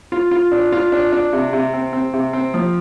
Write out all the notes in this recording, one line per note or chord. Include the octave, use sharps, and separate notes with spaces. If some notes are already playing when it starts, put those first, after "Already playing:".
F4
F4
D4
F4
D4
D4
C3
C3
C4
C4
C3
C4
F3